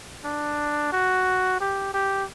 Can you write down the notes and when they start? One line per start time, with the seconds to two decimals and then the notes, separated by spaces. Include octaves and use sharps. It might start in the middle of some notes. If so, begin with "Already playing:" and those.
0.24 D4
0.92 F#4
1.60 G4
1.94 G4